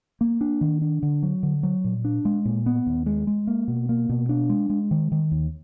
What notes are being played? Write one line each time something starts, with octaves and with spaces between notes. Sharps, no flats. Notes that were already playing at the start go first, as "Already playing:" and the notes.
A#3
D4
D#3
D4
D3
F#3
D3
F#3
A#2
D4
G#3
A#2
B3
D#2
G#3
G#3
A#3
B2
A#3
B2
D4
G#3
G#3
D#3
D#3
D#2